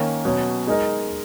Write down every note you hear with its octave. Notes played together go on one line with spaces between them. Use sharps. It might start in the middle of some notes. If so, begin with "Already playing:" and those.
Already playing: D#3 A#3 C#4
B2 F#3 C#4
G#3 D#4 A#4 D#5